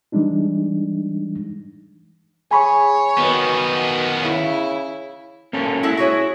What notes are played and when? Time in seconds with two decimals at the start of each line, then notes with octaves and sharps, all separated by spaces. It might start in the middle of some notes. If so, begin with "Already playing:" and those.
0.12 E3 G3 G#3 D4 D#4
2.51 G#4 C#5 G#5 B5 C#6
3.18 B2 D#3 B3
4.22 C#3 E4
5.53 A#3 C#4 A4
5.83 G#3 E4 A4 F#5
5.97 F#4 G#4 C#5